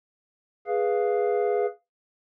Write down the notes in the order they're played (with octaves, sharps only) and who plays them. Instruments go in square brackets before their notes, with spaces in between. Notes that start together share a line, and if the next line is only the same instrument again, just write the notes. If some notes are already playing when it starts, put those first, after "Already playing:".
[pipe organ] G#4 B4 F5